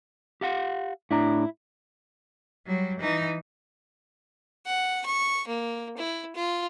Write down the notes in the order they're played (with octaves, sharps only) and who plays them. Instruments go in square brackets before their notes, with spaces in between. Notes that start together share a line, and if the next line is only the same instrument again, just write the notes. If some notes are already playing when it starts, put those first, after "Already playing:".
[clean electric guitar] G4 F5 F#5
[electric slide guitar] A2 D4 A#5 [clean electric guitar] E4
[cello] F#3 G3
E3 D#4
[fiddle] F#5
C#6
A#3
E4
F4